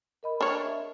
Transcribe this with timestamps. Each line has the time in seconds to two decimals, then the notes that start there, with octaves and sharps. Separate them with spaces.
0.23 A#4 D#5 B5
0.41 D4 C#5 F6
0.62 E5